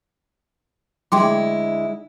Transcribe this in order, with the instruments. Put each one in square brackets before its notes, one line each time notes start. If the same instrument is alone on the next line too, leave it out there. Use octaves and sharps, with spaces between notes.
[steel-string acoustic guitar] D2 G#3 E4 [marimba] G5 C6 D6